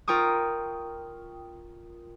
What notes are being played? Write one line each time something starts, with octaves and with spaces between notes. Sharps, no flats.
F4 A#4 G5 C#6 D#6